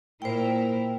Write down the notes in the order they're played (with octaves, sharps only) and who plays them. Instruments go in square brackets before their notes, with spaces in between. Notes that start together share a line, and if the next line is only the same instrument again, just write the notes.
[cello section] A#2 E4 A#4 [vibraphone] C5 G5